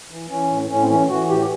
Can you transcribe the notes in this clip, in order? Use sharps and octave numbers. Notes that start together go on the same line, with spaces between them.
E3
E3 C#4
A2
A2 C#4
C4
E3 C#4
E3 F#4
A2 G4